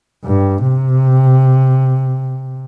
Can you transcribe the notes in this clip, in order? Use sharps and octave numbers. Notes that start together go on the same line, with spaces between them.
G2
C3